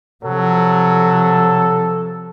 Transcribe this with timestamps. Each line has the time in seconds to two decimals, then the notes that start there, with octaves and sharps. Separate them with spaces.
0.24 C3 F3 F#3 A4